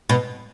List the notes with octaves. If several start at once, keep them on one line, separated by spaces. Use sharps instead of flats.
B2